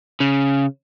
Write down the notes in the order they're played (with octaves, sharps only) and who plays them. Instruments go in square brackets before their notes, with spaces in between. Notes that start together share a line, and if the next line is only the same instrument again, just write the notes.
[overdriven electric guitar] C#3